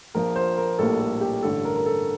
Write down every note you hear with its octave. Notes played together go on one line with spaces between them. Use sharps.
A#1 A#2 F3 A#4
C5
A#4
A#1 A2 G3 A#3 A4
A4
G4
A1 G2 D3 A4
A#4
A#4
A4